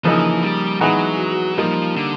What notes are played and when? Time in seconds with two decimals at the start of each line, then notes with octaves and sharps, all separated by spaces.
0.04 C#3 E3 F3 A#3 D#4
0.42 G3
0.81 E3 F#3 G#3 B3 D#4 F#4
1.57 F3 G3 A#3 D#4
1.96 D3